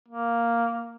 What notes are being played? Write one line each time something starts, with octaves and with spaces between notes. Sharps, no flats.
A#3